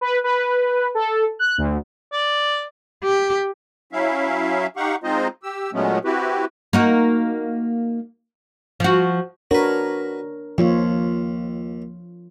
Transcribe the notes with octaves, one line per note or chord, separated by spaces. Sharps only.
B4
B4
A4
F#6
D2
D5
G4
F#3 C#4 E4 E5 F5
D#4 G4 F5 F#5 C#6
G#3 C4 D#4 F4 C5 D#5
G4 E6
A#2 F#3 G#3 A3 B3 C#4
C4 E4 F#4 G4 B4
A#3 D#4 F#4
F3 F#4
D4 F#4 A#4 B4 C#5
D#2 F3 F4 C#5